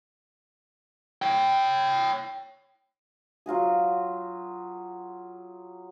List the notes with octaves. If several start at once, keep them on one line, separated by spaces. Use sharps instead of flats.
C#5 G5
F#3 F4 F#4 G#4